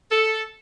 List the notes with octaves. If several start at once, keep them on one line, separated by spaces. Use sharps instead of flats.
A4